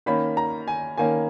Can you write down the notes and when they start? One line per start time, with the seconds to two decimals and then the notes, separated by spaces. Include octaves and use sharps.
0.06 D#3 A#3 C#4 B5
0.37 A#5
0.68 G#5
0.97 D#3 A#3 C#4 G#5